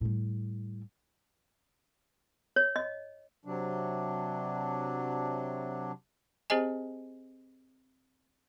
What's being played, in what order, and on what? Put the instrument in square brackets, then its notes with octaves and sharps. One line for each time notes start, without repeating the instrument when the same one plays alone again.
[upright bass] A2 G3
[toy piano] C#5
D#5
[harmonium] C3 F#3 D4
[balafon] C4 G4 G#4 C5 D#5 G#5